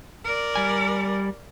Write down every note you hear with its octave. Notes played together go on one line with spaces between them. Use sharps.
A#4 D5
G3 G#5